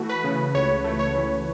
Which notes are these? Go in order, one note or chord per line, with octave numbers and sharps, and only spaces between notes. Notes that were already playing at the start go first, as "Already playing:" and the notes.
Already playing: E3 A3 F#4
B4
C#3
C#2 C#5
A3
C#5
E3